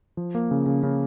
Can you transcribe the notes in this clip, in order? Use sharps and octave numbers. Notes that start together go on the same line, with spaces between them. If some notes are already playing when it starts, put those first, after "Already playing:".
F3
A#3
C#3
C#3
C#3